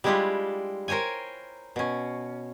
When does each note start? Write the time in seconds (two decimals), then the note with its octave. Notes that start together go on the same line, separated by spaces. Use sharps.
0.04 G3 G#3 D4 E4 F4 G4
0.88 A#4 C5 C#5 G5 G#5
1.76 B2 C#4